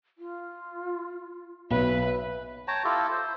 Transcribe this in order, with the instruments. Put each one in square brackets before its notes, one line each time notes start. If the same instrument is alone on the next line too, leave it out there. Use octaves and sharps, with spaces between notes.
[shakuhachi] F4
[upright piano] B1 [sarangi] B4 [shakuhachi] E5
[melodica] C#5 G5 A5 A#5
E4 F4 G4 A4
C5